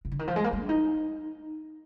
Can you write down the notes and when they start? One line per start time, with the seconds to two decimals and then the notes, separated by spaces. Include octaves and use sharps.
0.05 C3
0.12 D3
0.19 D#3
0.28 F3
0.36 G#3
0.44 A#3
0.53 G3
0.60 D4
0.69 D#4